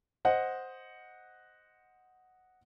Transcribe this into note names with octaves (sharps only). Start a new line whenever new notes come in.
C5 D#5 F#5